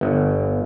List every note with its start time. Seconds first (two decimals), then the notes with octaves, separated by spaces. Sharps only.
0.01 G1